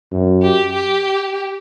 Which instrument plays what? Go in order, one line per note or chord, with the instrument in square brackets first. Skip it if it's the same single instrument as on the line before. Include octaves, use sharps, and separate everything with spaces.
[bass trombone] F#2
[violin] G4
G4